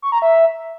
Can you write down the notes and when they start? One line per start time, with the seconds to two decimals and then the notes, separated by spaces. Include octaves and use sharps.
0.02 C#6
0.12 A#5
0.22 E5